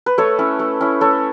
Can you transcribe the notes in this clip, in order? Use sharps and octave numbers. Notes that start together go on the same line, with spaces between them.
B4
A3 A4 C#5
C#4 E4
A3
C#4 E4
A3 A4 C#5